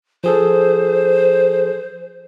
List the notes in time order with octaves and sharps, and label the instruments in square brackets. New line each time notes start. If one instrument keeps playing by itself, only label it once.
[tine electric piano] F3 G#4 A4 [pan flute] C5